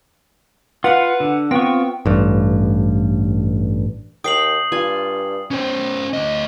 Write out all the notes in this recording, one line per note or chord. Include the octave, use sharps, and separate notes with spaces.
F4 B4 F5 F#5
D3
B3 C4 F4 G5 C#6
A1 G2
D#2 G5 A#5 D#6 C7 F#7
G2 F4 F5 G#5
C#4 C5
D2 D#5